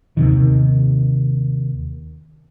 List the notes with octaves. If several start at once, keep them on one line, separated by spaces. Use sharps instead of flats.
D#2 C3 D#3